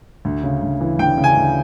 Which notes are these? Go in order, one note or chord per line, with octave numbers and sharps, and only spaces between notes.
D2
C#3
D2
E3
D2 G5
C#3
G#5
D2